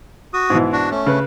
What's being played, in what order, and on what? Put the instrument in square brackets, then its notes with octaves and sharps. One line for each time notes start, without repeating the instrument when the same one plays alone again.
[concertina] F#4 D#6
[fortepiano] G#2 B2 E3
[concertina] D4 F#4
A3 C#4
[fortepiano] C#3 B4